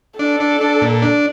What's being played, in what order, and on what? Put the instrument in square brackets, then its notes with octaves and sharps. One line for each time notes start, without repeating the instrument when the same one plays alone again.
[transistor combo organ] D4 [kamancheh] A4
[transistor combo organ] D4
D4
A#2
D4